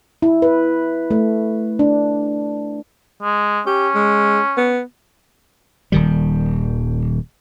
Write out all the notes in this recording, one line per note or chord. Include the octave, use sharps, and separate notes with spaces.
E4
B4
A3
D4
G#3
C#4 G4
G#3
B3
D#1 D#3 G3